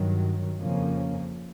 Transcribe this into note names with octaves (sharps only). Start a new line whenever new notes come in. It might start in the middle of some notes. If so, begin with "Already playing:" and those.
Already playing: G2 D#3 F#3
F2 C#3 F3 A#3 C#4